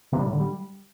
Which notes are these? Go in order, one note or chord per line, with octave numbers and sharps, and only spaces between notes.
C3
G3
A2
D3
G3